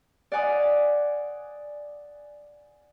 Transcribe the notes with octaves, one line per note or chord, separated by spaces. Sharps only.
D5 F5 F#5 G#5 D6 D#6